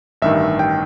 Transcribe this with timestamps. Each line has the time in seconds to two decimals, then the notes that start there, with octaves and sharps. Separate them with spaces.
0.22 A1 G2 D#3 E5
0.59 G5